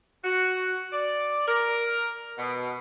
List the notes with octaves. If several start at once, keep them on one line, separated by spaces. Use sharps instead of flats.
F#4
D5
A#4
B2